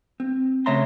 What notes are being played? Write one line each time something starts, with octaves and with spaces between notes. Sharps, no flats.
C4
C#3 A3 C#5 E5 A#5 C6